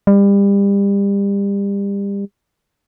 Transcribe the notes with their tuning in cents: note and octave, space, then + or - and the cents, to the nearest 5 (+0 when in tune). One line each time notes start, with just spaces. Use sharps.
G3 +30